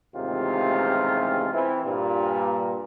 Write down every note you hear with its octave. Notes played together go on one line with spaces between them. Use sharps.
A1 D#2 C3 G#3 F4 G4
E3 C4 E4
G2 A#2 G3